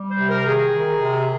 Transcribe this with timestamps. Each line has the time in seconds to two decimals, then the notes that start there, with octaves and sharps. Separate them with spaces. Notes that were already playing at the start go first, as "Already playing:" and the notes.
Already playing: G3
0.11 C5
0.19 C3
0.28 A#4
0.45 D#3 G#4
0.72 D#3
0.98 C3